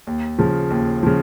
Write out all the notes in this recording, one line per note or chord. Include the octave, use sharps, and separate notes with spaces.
D#2
C#3 F3
D#2
C#3 F3